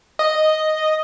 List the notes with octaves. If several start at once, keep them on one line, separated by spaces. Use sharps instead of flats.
D#5